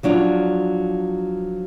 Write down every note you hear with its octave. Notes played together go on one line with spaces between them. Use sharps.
F3 F#3 D4 F4